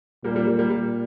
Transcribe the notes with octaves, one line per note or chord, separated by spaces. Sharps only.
A#2 G3 A#3
G3 A#3
G3
G3 A#3
A#2 G3 A#3